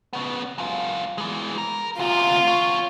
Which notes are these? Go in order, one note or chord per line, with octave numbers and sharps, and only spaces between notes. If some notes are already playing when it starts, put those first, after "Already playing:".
C#3 B3
F#2 F4
E3 G#3
A#4
D2 C3 F4
E2 C#5